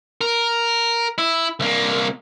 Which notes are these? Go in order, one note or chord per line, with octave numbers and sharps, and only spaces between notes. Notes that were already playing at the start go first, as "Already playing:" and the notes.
A#4
E4
C2 A#3